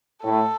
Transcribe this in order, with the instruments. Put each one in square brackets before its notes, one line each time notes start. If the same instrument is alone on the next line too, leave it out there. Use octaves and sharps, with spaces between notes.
[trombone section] A2 [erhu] A4